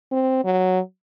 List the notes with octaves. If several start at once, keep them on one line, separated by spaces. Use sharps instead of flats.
C4
F#3